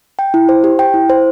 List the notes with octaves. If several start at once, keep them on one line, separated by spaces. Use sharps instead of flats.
G5
E4
C5
G4
G5
E4
C5